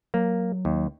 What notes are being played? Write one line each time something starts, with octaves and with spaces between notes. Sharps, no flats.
F#3 A#3
D#2